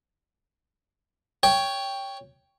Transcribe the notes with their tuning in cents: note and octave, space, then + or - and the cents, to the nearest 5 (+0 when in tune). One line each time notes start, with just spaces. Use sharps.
C#5 +10 G5 +5